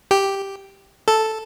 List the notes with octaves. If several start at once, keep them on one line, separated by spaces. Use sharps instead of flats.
G4
A4